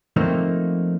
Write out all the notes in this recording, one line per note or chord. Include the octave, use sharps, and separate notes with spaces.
F3 A3 A#3 C4 D#4